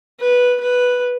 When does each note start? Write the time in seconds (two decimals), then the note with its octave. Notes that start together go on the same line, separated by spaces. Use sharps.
0.20 B4
0.60 B4